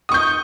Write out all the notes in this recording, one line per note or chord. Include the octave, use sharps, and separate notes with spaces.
C#6 D#6 G6